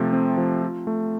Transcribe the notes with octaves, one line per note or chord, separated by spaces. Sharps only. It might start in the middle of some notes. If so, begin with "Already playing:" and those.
Already playing: C3 F3 A3 C4
C4
F3
F4
A3